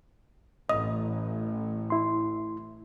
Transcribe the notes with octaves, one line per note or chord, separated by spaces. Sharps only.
A1 D#5 D#6
E4 C6